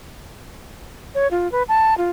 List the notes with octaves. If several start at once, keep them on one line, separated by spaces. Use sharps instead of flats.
C#5
F4
B4
A5
F4